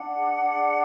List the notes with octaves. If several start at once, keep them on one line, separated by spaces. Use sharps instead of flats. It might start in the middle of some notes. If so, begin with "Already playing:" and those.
Already playing: D4 F#5
G#4
D4